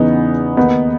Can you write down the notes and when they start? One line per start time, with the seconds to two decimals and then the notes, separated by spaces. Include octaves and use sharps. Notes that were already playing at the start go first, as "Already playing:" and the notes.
Already playing: E2 C#3 E3 B3 D#4
0.57 D#2 D#3 B3 D#4